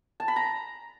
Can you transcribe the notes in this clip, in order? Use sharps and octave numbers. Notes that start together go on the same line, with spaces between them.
A5
B5
A#5